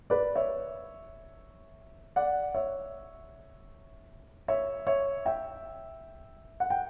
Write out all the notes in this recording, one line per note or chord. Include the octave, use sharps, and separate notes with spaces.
B4 D5
C#5 E5
D5 F#5
C#5 E5
C#5 E5
C#5 E5
E5 G5
F#5
G5